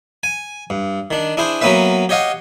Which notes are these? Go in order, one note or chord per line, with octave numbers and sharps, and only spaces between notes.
G#5
G2
D#3 D4
D4 E4 G#4 C5
F#3 A#3 B3 C#4 B4 E5
G4 C#5 D#5 F5 F#5